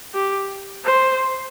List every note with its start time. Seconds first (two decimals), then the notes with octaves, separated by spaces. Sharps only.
0.14 G4
0.84 C5